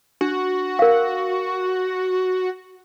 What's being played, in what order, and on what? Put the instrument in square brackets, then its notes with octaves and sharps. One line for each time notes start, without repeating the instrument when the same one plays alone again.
[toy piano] D4 [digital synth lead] F#4
[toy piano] A#4 F5